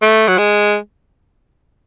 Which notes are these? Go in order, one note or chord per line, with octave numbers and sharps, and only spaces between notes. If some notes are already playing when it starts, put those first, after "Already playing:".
A3
F#3
G#3